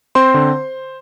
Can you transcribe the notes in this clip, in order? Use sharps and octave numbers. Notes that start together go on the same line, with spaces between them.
C4 C5 C6
D3